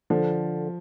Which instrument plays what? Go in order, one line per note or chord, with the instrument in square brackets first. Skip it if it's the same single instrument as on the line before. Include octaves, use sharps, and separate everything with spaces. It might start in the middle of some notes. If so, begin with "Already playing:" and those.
[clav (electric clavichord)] D3 [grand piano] F3